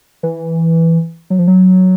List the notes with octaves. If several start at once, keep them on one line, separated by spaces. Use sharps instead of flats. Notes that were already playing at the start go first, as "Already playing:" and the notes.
E3
F#3
F3
F#3